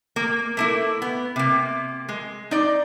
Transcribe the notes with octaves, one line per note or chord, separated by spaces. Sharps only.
A#3
A3 A#3 E4
B3
C3 A#3
G#3
D#4 D5